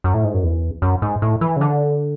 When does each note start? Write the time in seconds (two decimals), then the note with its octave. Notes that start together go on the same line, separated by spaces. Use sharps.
0.04 F#2
0.14 A2
0.24 G#2
0.34 F#2
0.43 E2
0.82 F#2
1.02 G#2
1.22 A2
1.41 E3
1.56 C#3
1.61 D3